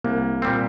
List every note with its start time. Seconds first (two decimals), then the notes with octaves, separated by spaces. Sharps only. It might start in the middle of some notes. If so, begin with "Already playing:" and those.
0.04 C2 A#3
0.42 A#2 G3 C4